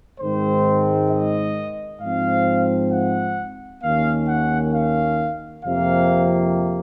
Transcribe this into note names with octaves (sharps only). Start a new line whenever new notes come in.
G#2 D#3 G#3 C4 C5
D#5
G#2 F3 C4 F5
F#5
D#2 D#3 A#3 C#4 F5
F#5
F5
F2 C3 F3 A#3 F5